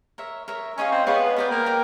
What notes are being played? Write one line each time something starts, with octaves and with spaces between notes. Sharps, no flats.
A#4 C#5 E5
A#4 C#5 E5
C#4 D#4 G#4 C#5 F5
C4
B3 D#4 G#4 C#5 F5
B3 A#4 D5 G5
A#3
A#4 D5 G5